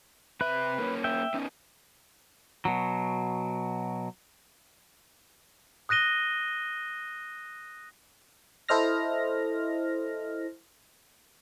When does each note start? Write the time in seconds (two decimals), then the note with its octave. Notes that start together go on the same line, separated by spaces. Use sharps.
0.41 C3 B4 E5
0.78 A#3 C4 C#4
1.04 E5 G5
1.34 B3 C#4 D#4
2.65 B2 F#3
5.89 D#6 F#6 A#6 D#7 G7
8.69 E4 A4 C5 D#5 F6 A#6